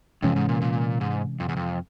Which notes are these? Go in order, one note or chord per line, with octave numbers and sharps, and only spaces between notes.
F2 C3 E3 G#3 C#4
G#2
A#2
A#2
G#2
F2
E2
F2